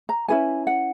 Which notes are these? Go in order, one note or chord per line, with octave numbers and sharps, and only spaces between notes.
A#5
C#4 E4 G#4 B4 G#5
F#5